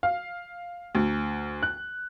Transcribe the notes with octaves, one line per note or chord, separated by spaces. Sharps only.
F5
D2
F#6